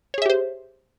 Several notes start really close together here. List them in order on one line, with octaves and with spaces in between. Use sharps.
C#5 G#4 E5 G4 C5